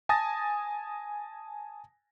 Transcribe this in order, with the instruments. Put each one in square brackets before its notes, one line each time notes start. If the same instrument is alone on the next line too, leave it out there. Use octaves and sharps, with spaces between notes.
[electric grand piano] G#5 A5 D#6 A6 A#6